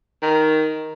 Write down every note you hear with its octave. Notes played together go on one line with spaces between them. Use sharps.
D#3